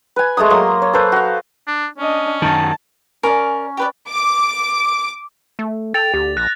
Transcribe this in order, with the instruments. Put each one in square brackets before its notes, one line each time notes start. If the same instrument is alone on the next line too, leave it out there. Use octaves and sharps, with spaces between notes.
[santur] B4 G#5
G#3 A3 A#5 D#6
F#3 A#3 C6 D#6
C#5
A4 B4 C5
F#4 F5
[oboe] D4
[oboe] C#4 [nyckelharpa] D4 D#5
[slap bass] F#2 D#3 [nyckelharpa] A5
[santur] C#4 [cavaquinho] A#4 D5
[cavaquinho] G4 B4 D5
[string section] D6
[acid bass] A3
[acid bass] A4 [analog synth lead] G5 [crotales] A6 F7
[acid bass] D2 [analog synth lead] G4
[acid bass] A#1 [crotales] F#6 [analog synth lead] A#6